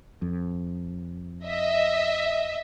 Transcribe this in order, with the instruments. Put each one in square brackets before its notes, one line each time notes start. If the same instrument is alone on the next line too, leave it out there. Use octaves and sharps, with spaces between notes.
[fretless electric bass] F2
[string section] D#5 E5